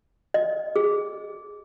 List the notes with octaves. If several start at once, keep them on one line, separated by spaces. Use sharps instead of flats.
D#5
G#4